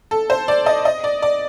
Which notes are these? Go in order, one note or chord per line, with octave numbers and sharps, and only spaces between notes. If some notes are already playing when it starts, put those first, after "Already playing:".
A4
C5
D5
D#5
D#5
D5
D5